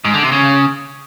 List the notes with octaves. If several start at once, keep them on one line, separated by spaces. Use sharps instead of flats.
G#2
D3
C3
C#3